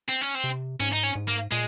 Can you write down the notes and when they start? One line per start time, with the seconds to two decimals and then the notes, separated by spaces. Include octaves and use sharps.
0.08 C4
0.21 C#4
0.35 C4
0.44 C3
0.80 G#2 C#4
0.93 D#4
1.03 C#4
1.15 G#2
1.28 A#3
1.51 A#2 G#3